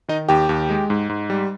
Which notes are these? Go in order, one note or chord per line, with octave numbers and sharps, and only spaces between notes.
D#3 D#4 D#5
D#2 G4 G5
D#2
G#3
G#2
G#2
G3